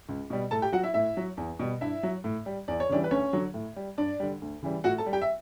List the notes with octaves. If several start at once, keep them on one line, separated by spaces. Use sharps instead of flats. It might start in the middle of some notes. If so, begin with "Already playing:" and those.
C#2
B2 G3
A2 A4 A5
G4 G5
F#3 F#4 F#5
E4 E5
A2 E4 E5
F#3
E2
B2 G3
G2 E4 E5
F#3
A2
G3
E2 D5
C#5
C#3 E3 G3 D4 D5
B4
D2 C#4 C#5
D3 F#3
A2
G3
G2 D4 D5
D3 G3
D2
C#3 E3 G3
A2 F#4 F#5
A4 A5
G3
G4 G5
E5